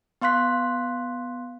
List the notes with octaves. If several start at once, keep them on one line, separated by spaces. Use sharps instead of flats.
B3 F5 C6 F#6 B6